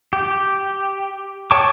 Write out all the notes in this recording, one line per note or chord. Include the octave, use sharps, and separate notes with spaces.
G4
C#5 G5 A5 C#6 D6